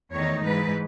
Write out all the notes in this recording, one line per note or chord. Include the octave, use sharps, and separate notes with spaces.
E2 D#3 A3 D#4 C#5
G#2 E3 G#3 B4